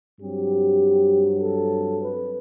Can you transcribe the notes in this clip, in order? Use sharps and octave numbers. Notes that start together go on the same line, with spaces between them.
G2 F#3 C4 G4
A4
B4